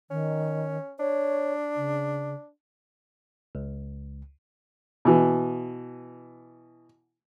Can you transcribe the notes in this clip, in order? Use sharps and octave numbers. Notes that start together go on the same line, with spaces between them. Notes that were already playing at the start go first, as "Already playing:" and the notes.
D#3 C#4
D4 C#5
C#3
C#2
B2 E3